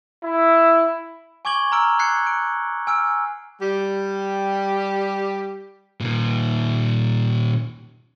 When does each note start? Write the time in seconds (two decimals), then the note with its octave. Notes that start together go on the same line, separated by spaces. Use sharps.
0.23 E4
1.45 G#5 C#6 D6 G#6 F#7 G7
1.72 A#5 E6 F6 D7
1.99 F#6 G#6 C7 C#7
2.27 D7
2.87 G#5 E6 F6 D7
3.61 G3 G4
6.00 A#2 D#3